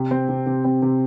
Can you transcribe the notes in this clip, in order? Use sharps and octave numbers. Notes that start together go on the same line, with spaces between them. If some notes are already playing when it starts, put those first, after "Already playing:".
Already playing: C3
C4
C3
C3
C4
C3